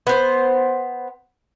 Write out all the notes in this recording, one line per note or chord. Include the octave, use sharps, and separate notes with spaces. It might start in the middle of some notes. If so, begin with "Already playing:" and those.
B3 C5